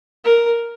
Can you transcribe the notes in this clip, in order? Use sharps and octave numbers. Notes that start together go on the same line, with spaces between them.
A#4